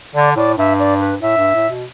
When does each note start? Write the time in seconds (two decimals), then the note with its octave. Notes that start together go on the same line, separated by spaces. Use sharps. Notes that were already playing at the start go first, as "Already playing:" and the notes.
0.15 D3 D5
0.36 A2 D5
0.58 G2 E5
0.79 D5
1.00 B4
1.22 A2 E5
1.38 G2
1.54 A2
1.70 B2